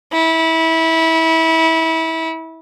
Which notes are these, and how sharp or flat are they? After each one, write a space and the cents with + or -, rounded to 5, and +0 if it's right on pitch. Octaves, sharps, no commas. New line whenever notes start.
E4 -25